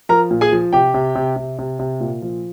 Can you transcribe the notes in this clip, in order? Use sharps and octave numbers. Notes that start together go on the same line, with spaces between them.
F3 A#4 A#5
A#2
G#4 G#5
F3
C3 G4 G5
C3
C3
C3
C3
C3
A#2
F3